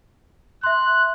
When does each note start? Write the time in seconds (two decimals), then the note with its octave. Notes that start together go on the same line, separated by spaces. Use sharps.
0.63 E5 C6 F#6